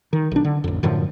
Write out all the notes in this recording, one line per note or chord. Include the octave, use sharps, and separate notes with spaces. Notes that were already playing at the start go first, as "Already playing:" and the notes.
D#3
B1 D4
D3
A1 F2
F#2 A2 D3 F3